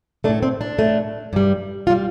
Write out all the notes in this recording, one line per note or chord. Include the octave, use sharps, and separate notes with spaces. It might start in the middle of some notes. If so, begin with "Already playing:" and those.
A2 A3 D4
C4
D4
A2 A3
G2 G3
F4
G3